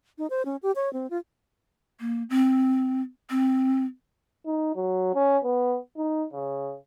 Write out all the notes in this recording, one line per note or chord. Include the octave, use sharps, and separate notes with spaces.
D#4
C5
C#4
G4
C#5
C4
F4
A#3
C4
C4
D#4
F#3
C#4
B3
D#4
C#3